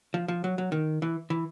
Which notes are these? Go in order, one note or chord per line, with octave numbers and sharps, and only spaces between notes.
F3
F3
F#3
F#3
D#3
E3
E3